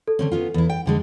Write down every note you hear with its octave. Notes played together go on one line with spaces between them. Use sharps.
A4
D3 C4 C#4
B3 C#4 F4
E2 E4
G5
F2 D3 G#3